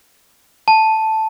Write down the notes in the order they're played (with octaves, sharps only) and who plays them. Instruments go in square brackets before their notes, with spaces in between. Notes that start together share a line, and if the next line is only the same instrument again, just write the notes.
[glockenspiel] A5